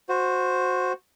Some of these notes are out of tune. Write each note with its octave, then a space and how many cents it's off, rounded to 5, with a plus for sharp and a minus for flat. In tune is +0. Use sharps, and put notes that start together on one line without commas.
F#4 -15 C5 +0